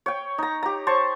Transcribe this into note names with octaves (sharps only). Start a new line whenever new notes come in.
C#5 G5
D#4 A#5
G4 A#5
C5 C#5 A5 C#6